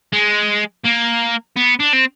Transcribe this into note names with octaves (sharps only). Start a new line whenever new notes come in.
G#3
A#3
B3
D4
C4